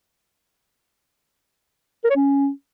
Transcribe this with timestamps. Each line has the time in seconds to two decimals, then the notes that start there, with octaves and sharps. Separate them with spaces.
2.04 A#4
2.10 C#5
2.16 C#4